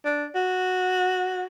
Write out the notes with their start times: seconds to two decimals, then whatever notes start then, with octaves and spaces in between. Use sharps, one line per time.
0.05 D4
0.35 F#4